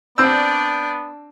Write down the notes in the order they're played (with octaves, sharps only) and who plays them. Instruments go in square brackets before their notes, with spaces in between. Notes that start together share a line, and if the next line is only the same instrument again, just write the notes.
[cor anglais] B3 [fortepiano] C4 E6 [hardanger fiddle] D4 D5 [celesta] G6